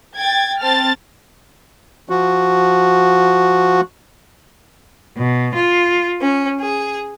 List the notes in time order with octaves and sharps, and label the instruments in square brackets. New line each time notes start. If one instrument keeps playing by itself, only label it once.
[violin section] G5 G#6 A6
C4 A5 F6 A6
[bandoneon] F3 F#4
[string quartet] B2
F4
C#4
G#4